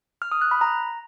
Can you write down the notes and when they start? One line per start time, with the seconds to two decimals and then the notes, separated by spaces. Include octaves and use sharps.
0.22 F6
0.32 D#6
0.41 F#6
0.51 B5
0.61 A#5